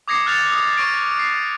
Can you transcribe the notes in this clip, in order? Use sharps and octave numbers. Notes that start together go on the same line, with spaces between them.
D6 D#6 G#6 A#6 C7 C#7
F6 F#6 A6 C#7 F7
D#6
C#6 A#6 D7
C7